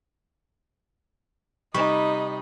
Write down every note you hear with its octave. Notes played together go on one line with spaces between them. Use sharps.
C3 G3 D#4 G4 D#5 B5 C#6